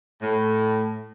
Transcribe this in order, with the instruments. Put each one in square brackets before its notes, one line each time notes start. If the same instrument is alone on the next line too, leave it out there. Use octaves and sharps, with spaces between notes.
[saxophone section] A2